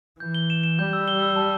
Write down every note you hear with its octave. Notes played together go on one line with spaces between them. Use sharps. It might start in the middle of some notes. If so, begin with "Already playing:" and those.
E3 G6
G7
E7
E7
G3 G6
E6
G7
E6
A5